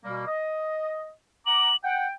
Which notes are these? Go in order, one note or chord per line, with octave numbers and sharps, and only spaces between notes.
B2 G3 A#3
D#5
F#5 A#5 D6 F#7
F#5 G5